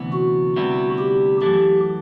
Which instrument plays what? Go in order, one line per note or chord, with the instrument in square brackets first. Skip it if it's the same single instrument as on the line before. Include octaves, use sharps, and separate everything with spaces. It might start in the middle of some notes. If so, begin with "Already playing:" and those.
Already playing: [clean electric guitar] D2 C3 E3 B3
[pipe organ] F#4
[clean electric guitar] D2 C3 G3 B3 E4
[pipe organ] G4
[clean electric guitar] F#2 E3 A3 [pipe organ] G4